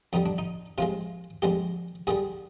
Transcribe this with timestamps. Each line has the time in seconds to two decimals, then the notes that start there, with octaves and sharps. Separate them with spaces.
0.13 F2 D3 G3 D#4
0.26 D4
0.38 D#4
0.78 C3 F3 G#3 F4
1.42 F2 D3 G#3 G4
2.07 G2 D3 G3 G#4